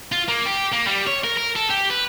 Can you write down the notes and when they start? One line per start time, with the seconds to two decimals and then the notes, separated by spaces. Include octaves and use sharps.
0.12 F4
0.28 A#3
0.46 G4
0.72 A#3
0.87 G3
1.07 C#5
1.24 A#4
1.37 A#4
1.56 A4
1.70 G4
1.90 B4